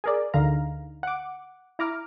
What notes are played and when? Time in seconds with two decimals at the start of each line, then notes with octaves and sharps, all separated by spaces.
0.04 G#4 A#4 D5
0.34 D2 D3 D#4 F5 A#5
1.03 F#5 D6
1.79 E4 A#5 D6 F6